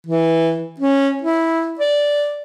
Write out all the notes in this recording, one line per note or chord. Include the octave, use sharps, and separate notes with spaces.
E3
C#4
E4
D5